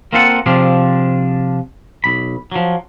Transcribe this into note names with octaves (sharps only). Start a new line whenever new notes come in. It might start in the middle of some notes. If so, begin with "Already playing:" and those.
A#3 C4 F4 A4 F5 F#5
C3 F3 C4 D4 F4 G#4
B1 B5
F3 F#3